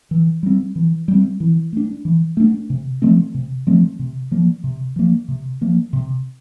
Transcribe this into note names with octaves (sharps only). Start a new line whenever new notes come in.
E3
G3 C4
E3
G3 C4
E3
A3 D4
E3
A3 D4
C3
F3 A3 C4
C3
F3 A3 C4
C3
F3 A#3
C3
F3 A#3
C3
F3 A#3
C3